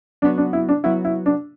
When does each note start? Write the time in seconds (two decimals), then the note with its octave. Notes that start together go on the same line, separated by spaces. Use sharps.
0.22 F#3 B3 D4 F#4
0.38 D4
0.53 E4
0.69 D4
0.84 F#3 B3 E4 F#4
1.05 E4
1.26 D4